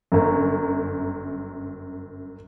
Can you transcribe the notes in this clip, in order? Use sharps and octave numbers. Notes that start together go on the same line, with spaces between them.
G1 F#2